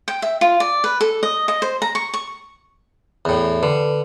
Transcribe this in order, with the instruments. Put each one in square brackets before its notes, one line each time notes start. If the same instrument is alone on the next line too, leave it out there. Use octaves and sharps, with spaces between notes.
[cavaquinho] G5
E5
F4
D5
B4
A4
D#5
D#5
C5
A#5
C#6
C#6
[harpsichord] E2 A2
[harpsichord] D3 [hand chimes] B4